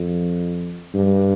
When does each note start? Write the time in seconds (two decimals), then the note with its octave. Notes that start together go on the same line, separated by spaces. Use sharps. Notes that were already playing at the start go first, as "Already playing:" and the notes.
Already playing: F2
0.94 G2